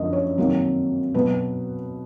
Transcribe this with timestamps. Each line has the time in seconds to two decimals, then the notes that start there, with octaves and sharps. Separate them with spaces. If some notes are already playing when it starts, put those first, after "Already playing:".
Already playing: F#2 D3 F3 A3 D#5
0.13 C#5
0.38 C3 D#3 F#3 A#3
1.14 B2 F#3 B4